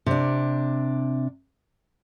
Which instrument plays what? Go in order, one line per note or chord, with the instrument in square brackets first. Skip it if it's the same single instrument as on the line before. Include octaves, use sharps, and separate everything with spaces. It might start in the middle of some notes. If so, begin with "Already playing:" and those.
[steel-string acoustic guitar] C3 D4